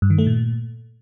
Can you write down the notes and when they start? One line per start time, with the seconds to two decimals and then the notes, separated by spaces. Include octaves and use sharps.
0.02 G2
0.10 D#3
0.18 A3
0.27 A#2